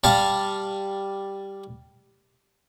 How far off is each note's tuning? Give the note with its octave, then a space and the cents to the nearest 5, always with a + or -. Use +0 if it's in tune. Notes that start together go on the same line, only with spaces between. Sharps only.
G3 +0 F5 +0 A5 +0